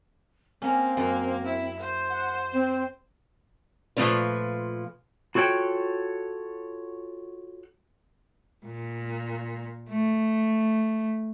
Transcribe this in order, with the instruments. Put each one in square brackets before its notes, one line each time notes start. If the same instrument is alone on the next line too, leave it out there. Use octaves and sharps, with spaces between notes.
[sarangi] A#3 [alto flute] C4 [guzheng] C#4
[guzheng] F#2 [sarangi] A#3
[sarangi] E4
C5
[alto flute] F#5
C4
[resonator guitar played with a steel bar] A#2 F3 F#3 A3 C#4 B4
[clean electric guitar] F4 F#4 A4 C#5 G5
[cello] A#2
A3